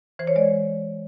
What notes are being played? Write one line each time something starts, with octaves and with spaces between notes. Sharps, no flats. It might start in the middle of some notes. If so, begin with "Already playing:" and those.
E3 C5
C#5
G#3 D5